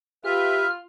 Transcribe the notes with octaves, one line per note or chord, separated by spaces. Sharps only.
F4 G4 B4 E5 F6